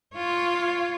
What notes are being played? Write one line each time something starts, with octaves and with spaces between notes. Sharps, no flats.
F4 C#5